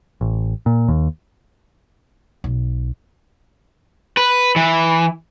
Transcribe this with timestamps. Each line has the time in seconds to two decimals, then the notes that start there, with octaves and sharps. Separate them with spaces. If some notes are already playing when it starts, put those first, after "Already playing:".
0.21 A1
0.66 A#2
0.88 D#2
2.44 B1
4.17 B4
4.56 E3